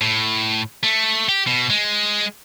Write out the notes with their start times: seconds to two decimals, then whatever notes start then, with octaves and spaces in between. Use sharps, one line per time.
0.01 A2
0.83 A3
1.29 G4
1.47 B2
1.70 G#3